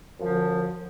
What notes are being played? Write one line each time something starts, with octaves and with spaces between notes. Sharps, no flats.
F#2 D3 F3